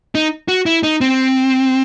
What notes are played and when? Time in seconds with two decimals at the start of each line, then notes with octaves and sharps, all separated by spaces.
0.15 D#4
0.48 F#4
0.66 E4
0.83 D#4
1.01 C4